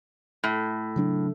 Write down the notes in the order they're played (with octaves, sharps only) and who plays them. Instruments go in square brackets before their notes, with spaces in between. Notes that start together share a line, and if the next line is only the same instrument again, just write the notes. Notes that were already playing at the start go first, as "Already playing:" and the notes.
[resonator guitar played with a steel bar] A2
[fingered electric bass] C#3 F#3 D4